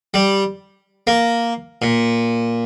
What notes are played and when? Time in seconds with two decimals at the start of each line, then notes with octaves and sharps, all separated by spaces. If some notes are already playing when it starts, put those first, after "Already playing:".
0.14 G3
1.07 A#3
1.82 A#2